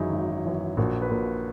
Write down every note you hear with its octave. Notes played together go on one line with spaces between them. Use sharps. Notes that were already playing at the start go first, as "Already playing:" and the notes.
Already playing: G#1 F#2 E3 D#4 E4 F#4 G#4
G#1
F#2 E3
A#1 F#4 A#4
B4
A#2 F#4 A#4